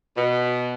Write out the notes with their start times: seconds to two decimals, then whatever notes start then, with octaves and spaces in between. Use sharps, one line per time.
0.17 B2